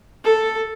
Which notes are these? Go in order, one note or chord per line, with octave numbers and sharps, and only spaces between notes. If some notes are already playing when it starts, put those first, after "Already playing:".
A4